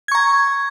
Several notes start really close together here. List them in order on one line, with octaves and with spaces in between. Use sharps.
G#6 C#6 A#5